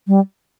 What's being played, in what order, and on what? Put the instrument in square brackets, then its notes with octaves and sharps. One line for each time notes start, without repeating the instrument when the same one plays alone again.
[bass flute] G3